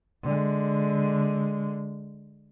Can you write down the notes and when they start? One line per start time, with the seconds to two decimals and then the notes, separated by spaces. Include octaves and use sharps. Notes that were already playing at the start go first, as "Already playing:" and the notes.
0.23 D3 G#3